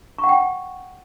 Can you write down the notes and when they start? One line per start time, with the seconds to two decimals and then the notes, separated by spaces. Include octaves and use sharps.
0.18 C#6
0.24 F#5
0.29 G5